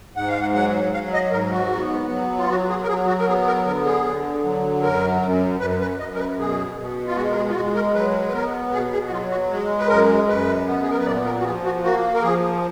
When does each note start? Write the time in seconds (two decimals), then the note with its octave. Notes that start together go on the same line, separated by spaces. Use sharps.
0.16 G#2 F#5
0.28 F5
0.41 F#5
0.54 F#3 F#5
0.93 F#3 F5
1.13 D#5
1.32 G#2 A#4
1.52 F#4
1.72 B3
2.10 F#3
2.38 F4
2.49 F#3 F#4
2.69 G#4
2.83 A#4
2.88 F#3 G#4
3.07 F#4
3.19 A#4
3.27 B3 G#4
3.47 A#4
3.65 D3 A#4
3.85 G#4
4.05 D3
4.44 F#3
4.82 F#2 A#4
5.22 F#2
5.60 F#2 B4
5.81 B4
5.99 F#2 D#5
6.14 A#4
6.19 B4
6.39 B2 G#4
6.77 B2
7.07 F4
7.16 G#3 F#4
7.31 A#4
7.35 G#4
7.49 F4
7.55 G#3 F#4
7.75 A#4
7.94 F#3 B4
8.28 B4
8.33 B3 A#4
8.73 B2 G#4
8.92 G#4
9.07 F#4
9.11 F#3 F4
9.31 F#4
9.50 G#3
9.78 B4
9.88 F#2 A#4
10.29 F#2 B4
10.67 B3
10.82 G#4
10.90 A#4
10.99 B4
11.05 A#2 D5
11.25 A#4
11.40 F#4
11.44 F3 G#4
11.65 F#4
11.84 A#3 F#4
12.14 A#4
12.22 F3 G#4